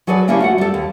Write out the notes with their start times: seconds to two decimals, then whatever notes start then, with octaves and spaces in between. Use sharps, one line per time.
0.07 F#3 G#4 A4 B4 D5
0.28 D3 A#3 C#4 D4 E4 G4
0.40 A3 F#4 F#5
0.58 G3 A4
0.74 D#2